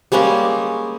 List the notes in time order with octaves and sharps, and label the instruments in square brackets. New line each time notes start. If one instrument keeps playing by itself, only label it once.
[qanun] G3 G#3 A#3 C#4